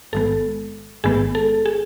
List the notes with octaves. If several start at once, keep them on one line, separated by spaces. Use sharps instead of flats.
A1 G#2 D#3 G#3 B3 A4
A1 G#2 D#3 G#3 B3 G#4
A4
G#4